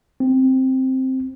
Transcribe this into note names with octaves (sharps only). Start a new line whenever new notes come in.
C4